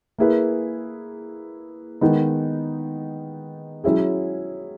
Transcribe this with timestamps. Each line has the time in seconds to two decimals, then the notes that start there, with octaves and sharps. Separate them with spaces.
0.18 A#3 E4 G#4 B4
2.01 D#3 G#3 B3 D#4
3.84 F#3 C#4 E4 G#4